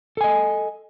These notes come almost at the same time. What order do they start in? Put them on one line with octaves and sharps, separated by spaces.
A4 G#5 D#5